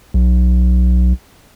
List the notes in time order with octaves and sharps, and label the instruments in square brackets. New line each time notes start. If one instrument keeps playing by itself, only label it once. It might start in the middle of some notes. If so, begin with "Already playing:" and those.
[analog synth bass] B1